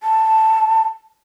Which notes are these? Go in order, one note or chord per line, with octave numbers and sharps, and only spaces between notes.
A5